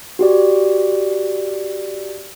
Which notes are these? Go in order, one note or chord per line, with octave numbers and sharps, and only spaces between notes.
F#4 G4 D5